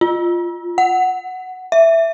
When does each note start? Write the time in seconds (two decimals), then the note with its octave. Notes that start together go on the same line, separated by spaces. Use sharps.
0.01 F4
0.78 F#5
1.72 E5